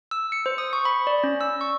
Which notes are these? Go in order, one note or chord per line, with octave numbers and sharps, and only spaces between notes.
E6
C#7
C5
D#6
C#6
B5
D5
C#4
E6
C#6